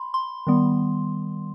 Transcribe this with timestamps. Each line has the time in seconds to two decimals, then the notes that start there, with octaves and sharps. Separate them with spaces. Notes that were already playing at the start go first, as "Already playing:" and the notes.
Already playing: B5 C6
0.14 C6
0.47 D#3 G3 B3